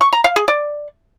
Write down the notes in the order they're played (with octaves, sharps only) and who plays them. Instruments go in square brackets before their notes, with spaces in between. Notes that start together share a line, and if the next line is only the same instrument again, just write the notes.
[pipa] C#6
A#5
F5
G#4
D5